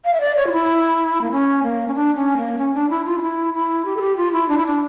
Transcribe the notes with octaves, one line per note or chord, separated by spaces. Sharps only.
F5
E5
D5
C#5
F4
E4
A#3
C#4
A#3
C#4
D4
C#4
A#3
C#4
D4
E4
F4
D4
E4
E4
G4
A4
G4
F4
E4
D4
E4
D4